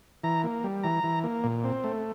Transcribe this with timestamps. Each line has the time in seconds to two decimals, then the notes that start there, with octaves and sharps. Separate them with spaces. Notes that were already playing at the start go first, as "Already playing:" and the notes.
0.23 E3 A#5
0.44 A#3
0.64 G3
0.83 E3 A#5
1.03 E3
1.24 A#3
1.44 A#2
1.64 C4
1.84 A3